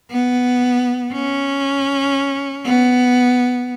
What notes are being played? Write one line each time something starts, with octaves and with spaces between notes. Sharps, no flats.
B3
C#4
B3